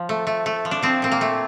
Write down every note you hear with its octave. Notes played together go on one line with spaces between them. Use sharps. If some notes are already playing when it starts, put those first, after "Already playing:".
Already playing: F3
A3
A3
A3
F3
D4
F3 C4
A#2 C4
A#3
A3